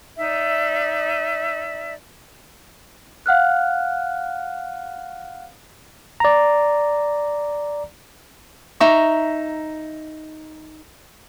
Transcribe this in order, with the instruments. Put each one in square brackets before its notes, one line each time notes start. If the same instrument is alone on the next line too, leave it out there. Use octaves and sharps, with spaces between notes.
[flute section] D#4 D5 E5
[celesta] F5 F#5 F6 F#6
[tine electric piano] D5 A#5
[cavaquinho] D#4 E5 A#5 C#6